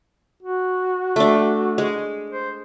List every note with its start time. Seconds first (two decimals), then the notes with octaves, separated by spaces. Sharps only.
0.42 F#4
1.16 A3 D4
1.78 G#3
2.30 C5